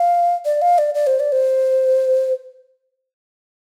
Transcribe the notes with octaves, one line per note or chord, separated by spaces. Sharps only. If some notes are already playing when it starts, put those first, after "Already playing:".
Already playing: F5
D5
F5
D5
D5
C5
D5
C5